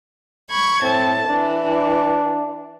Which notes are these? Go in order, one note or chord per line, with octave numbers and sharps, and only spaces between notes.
B5 C#6 G#6
A2 C4 A5
E3 D4
D4